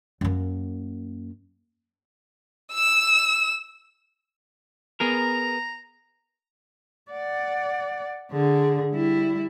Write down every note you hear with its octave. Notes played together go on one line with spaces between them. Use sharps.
F#2 A#3
E6 E7
B3 G#4 A#4 A#5
D5 F#5
D3 G#4
G3 E4